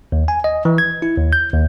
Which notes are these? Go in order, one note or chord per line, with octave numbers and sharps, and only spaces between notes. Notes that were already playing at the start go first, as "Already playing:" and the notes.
D#2
G#5
D#5
E3
G#6
E4
D#2
G6
D#2